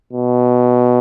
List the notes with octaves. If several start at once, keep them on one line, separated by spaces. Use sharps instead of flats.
B2